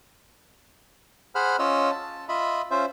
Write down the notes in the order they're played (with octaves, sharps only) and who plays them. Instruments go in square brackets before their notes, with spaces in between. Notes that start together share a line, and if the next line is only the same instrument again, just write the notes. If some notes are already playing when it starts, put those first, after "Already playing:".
[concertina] G#4 C5 F#5 B5 F6
C#4 F4 C#5 D#5 E6
A5
F4 D#5 E5 B5
C#4 F4 C5 E5